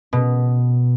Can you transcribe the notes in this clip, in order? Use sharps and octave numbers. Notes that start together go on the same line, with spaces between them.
B2